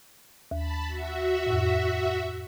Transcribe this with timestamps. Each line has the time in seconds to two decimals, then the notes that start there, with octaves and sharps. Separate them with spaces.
0.51 D#2 A5 B5
0.87 F#4 E5
1.46 F2 A2